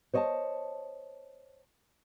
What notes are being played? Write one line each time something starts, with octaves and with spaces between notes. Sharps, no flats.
C5 C#5 D#5 G#5 A5